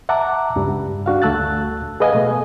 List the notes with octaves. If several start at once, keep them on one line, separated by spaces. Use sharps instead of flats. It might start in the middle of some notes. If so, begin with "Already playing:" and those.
E5 F#5 A5 A#5 D6
C#2 G2 G3
D4 F#4 F5
D2 A3 A5 E6 F#6 A6
G#4 B4 D#5 F5 F#5 G#5
B2 A3